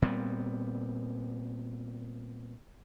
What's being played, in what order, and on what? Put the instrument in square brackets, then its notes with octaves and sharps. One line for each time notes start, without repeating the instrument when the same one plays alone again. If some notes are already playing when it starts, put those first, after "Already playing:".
[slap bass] A#2 G3 B3 C4